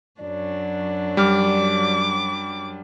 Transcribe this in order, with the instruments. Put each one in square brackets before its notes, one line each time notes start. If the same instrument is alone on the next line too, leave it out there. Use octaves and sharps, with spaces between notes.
[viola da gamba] F#2 F#3 D4 [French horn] D5
[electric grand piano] G3 F6 [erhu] D6